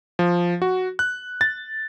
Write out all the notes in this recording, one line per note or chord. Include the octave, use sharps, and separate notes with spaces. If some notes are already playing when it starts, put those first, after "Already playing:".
F3
F#4
F#6
A6